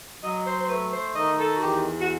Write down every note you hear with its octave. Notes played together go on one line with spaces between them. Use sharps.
F#3 D#5
C5
C5
A3 B4
C5
D#3 D#5
A4
F#4
E2 G4
F#4